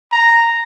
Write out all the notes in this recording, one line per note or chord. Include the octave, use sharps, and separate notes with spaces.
A#5